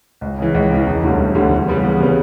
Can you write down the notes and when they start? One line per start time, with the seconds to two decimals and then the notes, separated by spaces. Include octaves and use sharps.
0.21 C#2
0.39 C#3 E3
0.54 C#2
0.71 C#3 E3
0.87 E1
1.03 D2 D3 G3 C#4
1.19 E1
1.35 D2 D3 G3 C#4
1.51 E2
1.68 C#3 G3 B3
1.83 E2
2.00 C#3 G3 B3